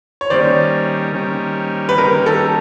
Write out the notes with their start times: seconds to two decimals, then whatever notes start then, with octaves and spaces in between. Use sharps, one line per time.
0.21 C#5
0.30 D#3 G3 A#3 C#4 C5 D5
1.14 D#3 G3 A#3 C#4
1.89 B4
1.98 D#3 G3 A#3 C#4 A#4
2.26 A4